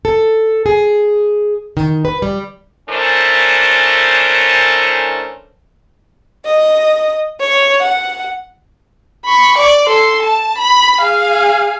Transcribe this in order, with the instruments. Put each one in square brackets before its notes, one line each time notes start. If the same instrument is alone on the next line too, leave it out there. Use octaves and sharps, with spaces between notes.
[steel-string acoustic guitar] A4
G#4
D#3
B4
G3
[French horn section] E3 A3 C#4 D4 A#4 C5
[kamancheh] D#5
C#5
F#5
B5 C#6
D5
A4 C6
A5
B5
G#4 F5